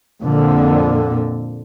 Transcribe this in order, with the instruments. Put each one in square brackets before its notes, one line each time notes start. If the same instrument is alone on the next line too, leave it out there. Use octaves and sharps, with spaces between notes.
[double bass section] F2 A#2 D3